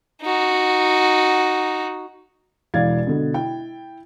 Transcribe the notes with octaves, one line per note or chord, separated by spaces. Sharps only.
D#4 F#4
E1 E3 D5 F5 G#6 A6
B2 D3 B3
E4 G5